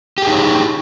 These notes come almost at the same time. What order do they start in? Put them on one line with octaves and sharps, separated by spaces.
G4 G#4 D#4 C#5 E4